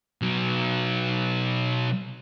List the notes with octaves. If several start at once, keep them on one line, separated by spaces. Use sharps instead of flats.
B2 F#3